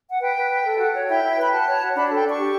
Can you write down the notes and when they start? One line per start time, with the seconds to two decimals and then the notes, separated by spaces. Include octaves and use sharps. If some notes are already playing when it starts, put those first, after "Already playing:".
0.10 F#5
0.20 B4 G5
0.36 B4
0.50 B4
0.65 A4
0.78 F#4
0.93 C#5
1.07 E4 G5
1.23 E4
1.36 B4
1.41 B5
1.51 F#4 A5
1.66 C#5
1.80 F#4
1.95 D4 B5
2.06 A5
2.09 A4
2.16 G5
2.23 D4 C#6
2.38 G4